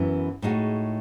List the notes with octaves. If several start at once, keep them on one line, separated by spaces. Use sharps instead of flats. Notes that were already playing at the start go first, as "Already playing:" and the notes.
Already playing: F#2 E3 B3 E4
A2 G#3 D#4 F#4